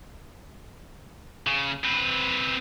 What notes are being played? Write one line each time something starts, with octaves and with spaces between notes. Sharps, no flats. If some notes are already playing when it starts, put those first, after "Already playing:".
C#3
C4 B4